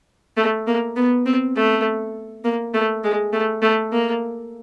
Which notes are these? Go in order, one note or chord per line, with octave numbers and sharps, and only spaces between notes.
A3
A#3
B3
C4
A3
A#3
A3
G#3
A3
A3
A#3